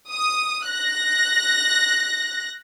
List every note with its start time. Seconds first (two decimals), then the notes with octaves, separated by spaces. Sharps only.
0.11 D#6
0.70 F#6 A#6